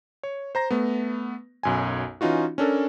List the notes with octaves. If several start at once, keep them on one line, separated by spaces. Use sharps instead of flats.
C#5
C5 A#5 A#6
A3 B3
B1 F#2 G#5
E3 C#4 D#4 F4 F#4
C#4 D4 A4 A#4